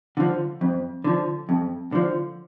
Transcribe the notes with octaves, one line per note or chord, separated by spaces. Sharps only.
D3 F3
F2
D3 F3
F2
D3 F3